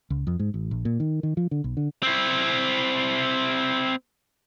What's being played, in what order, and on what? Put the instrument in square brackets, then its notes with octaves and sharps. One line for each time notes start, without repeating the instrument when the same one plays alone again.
[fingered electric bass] C#2
F2
G#2
A1
A#1
A#2
D#3
D#3
F3
D3
B1
D3
[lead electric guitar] C4 E4